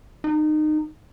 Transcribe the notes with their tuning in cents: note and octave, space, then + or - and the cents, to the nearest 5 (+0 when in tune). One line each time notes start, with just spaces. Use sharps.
D#4 -25